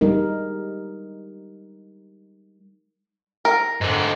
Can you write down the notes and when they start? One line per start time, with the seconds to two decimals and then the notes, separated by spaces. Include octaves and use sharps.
0.01 G3 G#3 D#4 A#4
3.45 A#4
3.81 G#2 D3